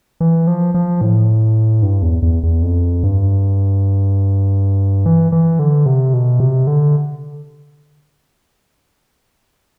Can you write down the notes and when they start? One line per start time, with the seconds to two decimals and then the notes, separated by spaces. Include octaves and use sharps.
0.20 E3
0.47 F3
0.74 F3
1.01 A2
1.83 G2
2.02 E2
2.22 E2
2.43 E2
2.63 F2
3.03 G2
5.06 E3
5.32 E3
5.59 D3
5.86 C3
6.14 B2
6.40 C3
6.67 D3